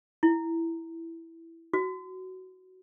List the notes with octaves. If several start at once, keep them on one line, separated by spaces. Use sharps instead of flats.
E4
F#4